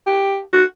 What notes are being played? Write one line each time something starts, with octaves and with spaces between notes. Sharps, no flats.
G4
F#4